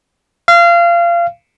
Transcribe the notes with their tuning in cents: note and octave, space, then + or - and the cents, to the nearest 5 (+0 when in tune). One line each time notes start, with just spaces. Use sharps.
F5 -25